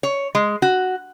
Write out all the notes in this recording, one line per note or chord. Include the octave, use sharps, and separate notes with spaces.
C#5
G#3
F#4